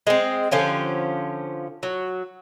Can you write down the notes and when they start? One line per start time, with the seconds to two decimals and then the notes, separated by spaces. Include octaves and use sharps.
0.07 G#3 C4
0.51 D3 F3 C#4 G4
1.83 F#3